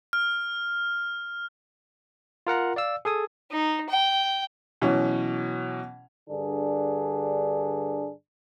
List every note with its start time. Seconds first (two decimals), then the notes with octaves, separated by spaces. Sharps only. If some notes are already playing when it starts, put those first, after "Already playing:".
0.13 F6
2.47 F4 A#4 F#5 A#5
2.76 D5 F5 E6
3.05 G#4 A4 G#5 D#6
3.51 D#4
3.90 G5
4.82 B2 E3 F#3 C#4
6.28 G2 D3 D4 G#4